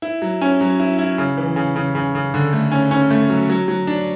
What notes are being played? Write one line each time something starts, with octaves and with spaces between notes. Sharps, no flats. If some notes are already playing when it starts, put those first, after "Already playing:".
E4
F#3
C#4
F#3
E4
E4
C#3
E3
C#3
C#3
C#3
C#3
D3
A3
C#4
C#4
A3
F#3
F#3
F#3
D4